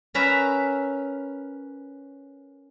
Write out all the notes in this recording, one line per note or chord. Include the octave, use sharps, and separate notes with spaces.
C#4 A#4 B4 E5 A#5 B5